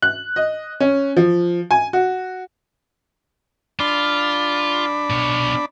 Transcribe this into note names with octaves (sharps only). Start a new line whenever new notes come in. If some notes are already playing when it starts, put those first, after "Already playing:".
F#6
D#5
C#4
F3
G#5
F#4
D4 F4 B5
B2 C#5